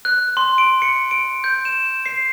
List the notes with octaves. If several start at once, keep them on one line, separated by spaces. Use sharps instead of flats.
F#6
C6
D7
C#7
D7
G6
E7
C7